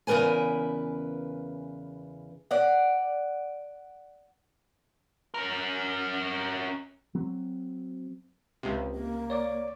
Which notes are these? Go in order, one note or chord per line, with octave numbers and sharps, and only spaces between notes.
E2 C#3 G#3 A#4 B4 G#5
D5 F#5
C#4 A#4
F#3 C4
C#2 C3
A#3
C#5 D5 D6